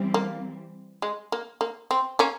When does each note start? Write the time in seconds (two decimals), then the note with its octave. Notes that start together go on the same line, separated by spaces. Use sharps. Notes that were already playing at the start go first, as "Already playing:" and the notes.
Already playing: E3 G3 C4
0.14 A#3
1.02 G#3
1.32 A#3
1.61 A#3
1.91 C4
2.19 A#3 C#4